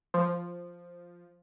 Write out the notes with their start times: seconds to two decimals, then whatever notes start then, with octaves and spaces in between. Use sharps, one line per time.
0.14 F3